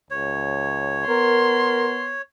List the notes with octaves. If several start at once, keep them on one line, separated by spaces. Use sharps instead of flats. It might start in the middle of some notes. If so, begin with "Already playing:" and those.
C#2 C#5
B3 A#4 C6